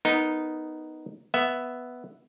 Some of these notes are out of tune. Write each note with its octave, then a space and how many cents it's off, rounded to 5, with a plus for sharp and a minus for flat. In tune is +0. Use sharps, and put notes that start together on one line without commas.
B3 +0 D#4 +0 A#4 -15
B3 +0 E5 +0